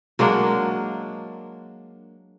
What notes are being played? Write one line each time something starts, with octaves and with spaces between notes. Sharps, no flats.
F#3 G#3 A#3 D4